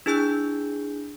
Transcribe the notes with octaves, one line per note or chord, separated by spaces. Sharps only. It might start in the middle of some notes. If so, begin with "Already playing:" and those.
D4 E4 G#4 G#5 E6 G6